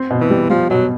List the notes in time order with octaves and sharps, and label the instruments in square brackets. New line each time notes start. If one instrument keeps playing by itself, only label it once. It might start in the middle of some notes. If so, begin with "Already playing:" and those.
Already playing: [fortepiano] C4
B2
[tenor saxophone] E3
[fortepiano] G3
[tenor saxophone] F3 [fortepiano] G3
[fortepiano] B2 [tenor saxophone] F#3